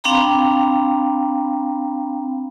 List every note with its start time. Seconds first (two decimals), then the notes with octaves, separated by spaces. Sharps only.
0.04 C4 D4 F5 G5 A#5 B5